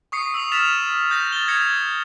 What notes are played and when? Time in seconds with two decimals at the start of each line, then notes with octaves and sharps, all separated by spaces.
0.12 C#6 D#6 C7 C#7
0.34 E6 C7 F7
0.52 F6 A6 B6 E7 F7
1.10 D#6 G6 A#6
1.32 A6 G7
1.48 G#6 A#6 C#7 F7